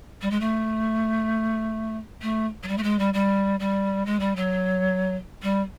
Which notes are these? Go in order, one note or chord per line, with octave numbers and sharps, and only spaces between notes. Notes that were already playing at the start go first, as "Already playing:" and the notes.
G3
G#3
A3
A3
F#3
G3
A3
G#3
G3
G3
G3
G#3
G3
F#3
G3